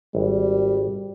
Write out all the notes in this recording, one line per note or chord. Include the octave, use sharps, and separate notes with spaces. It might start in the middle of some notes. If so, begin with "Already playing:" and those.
G#1 G3